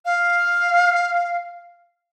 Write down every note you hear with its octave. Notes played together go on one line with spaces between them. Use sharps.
F5